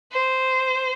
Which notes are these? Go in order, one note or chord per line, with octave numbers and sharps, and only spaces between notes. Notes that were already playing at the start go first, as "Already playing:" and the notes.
C5